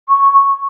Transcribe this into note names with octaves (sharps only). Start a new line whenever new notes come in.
C#6